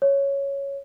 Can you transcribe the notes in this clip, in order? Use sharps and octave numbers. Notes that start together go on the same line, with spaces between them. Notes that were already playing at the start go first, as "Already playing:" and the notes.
C#5